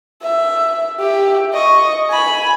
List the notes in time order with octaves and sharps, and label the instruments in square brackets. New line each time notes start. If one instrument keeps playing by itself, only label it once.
[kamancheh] E5
G4 E5
D#5 C#6
G#5 B5